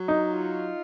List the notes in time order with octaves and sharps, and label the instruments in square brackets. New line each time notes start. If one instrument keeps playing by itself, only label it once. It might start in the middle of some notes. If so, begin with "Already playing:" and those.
Already playing: [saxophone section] F#3
[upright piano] D#4
[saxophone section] F4